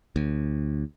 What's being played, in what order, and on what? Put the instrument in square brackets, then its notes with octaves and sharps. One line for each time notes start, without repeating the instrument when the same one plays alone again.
[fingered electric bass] D2